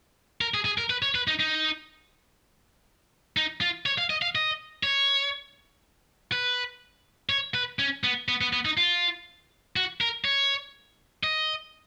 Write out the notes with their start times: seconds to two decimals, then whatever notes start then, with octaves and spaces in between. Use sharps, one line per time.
0.41 A#4
0.54 G#4
0.65 G#4
0.78 A#4
0.90 B4
1.02 C#5
1.15 B4
1.28 D#4
1.40 D#4
3.37 D#4
3.61 F4
3.86 C#5
3.98 F5
4.10 D#5
4.22 F5
4.35 D#5
4.83 C#5
6.32 B4
7.29 C#5
7.54 B4
7.79 C#4
8.04 B3
8.28 B3
8.41 B3
8.53 B3
8.65 D#4
8.77 F4
9.76 F#4
10.01 A#4
10.25 C#5
11.24 D#5